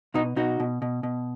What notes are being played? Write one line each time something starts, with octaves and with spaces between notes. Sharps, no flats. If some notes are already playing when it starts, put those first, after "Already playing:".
B2 D#4 F#4
B2 D#4 F#4
B2
B2
B2